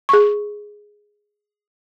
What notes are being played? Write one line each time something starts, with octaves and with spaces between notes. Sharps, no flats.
G#4 C#6